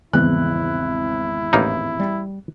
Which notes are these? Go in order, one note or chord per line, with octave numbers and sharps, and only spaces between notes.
G#1 E2 C#3 E3 G3 E4 F#6
A1 A#3 D#4
G3